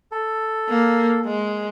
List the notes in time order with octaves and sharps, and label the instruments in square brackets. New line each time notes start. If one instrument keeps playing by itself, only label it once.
[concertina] A4
[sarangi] A#3
G#3